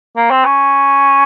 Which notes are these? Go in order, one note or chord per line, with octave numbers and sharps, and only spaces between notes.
A#3
C4
C#4